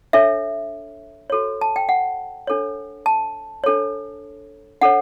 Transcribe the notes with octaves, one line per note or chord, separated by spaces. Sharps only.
D4 A4 C#5 E5
F#4 A4 C#5
A5
G5
F#5
D4 A4 C#5
A5
D4 A4 C#5
D4 A4 C#5 F#5